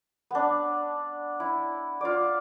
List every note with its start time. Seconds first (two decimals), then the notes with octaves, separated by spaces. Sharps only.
0.31 B3 D4
1.40 E4
2.01 F4 D5